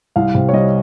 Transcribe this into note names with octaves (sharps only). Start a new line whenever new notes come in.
C2 F5
C3
C#5
G3 D#5